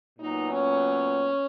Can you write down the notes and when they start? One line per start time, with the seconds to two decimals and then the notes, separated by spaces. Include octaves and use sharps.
0.18 A#2 F#3 B3 D#4
0.47 C#4